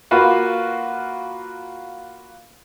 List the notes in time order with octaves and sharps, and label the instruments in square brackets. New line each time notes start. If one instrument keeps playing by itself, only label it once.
[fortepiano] A#3 F4 F#4 B4